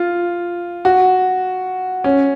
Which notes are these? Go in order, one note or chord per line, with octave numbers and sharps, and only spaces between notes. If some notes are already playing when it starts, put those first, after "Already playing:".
Already playing: F4
F#4
C#4